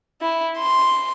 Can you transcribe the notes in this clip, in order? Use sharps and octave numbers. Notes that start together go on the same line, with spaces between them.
E4
C6